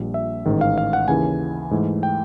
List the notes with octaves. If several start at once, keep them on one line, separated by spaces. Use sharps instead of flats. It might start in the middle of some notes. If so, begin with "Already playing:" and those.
Already playing: A#1 A#2 G3
E5
A1 G#2 D#3
F5
F5
F#5
D#2 C#3 E3 G#5
G#2 E3 A3
G5